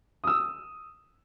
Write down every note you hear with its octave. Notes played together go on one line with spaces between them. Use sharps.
D#6 E6